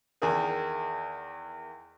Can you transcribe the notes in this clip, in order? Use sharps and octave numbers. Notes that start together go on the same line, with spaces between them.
E2 D#3 G#4 A#4